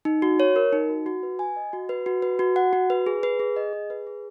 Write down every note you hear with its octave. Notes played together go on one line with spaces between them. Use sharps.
D#4
F#4
C#5
A#4
D#4
F#4
F#4
B4
G#5
D#5
F#4
B4
F#4
B4
F#4
F#5
F#4
B4
G#4
B4
G#4
D#5
G#4
B4
G#4